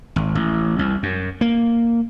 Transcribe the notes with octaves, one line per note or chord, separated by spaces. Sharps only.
G#1
A1
C2
F#2
A#3